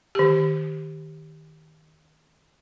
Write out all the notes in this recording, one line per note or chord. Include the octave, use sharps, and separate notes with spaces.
D#3 G4